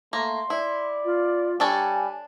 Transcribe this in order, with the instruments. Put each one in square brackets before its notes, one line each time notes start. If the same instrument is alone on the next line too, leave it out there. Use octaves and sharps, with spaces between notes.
[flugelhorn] A3 [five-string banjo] A#3 [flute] C6
[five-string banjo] E4 [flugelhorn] D5
[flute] F4
[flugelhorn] G3 [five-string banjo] D4 A4 C#5 [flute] G#5